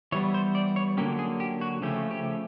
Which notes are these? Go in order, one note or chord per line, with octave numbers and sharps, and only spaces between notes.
E3 G3 B3 C#5
C5
D5
C#5
D3 F#3 A#3 C#4 G4
G#4
G4
F#4
C#3 F3 A3 C#4 G4
G4